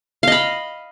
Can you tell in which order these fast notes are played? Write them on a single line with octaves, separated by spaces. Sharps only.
F5 D#5 B5